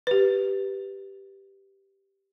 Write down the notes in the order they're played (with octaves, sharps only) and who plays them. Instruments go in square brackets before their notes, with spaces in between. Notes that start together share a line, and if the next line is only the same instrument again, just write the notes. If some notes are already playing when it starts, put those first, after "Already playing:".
[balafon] G4 B4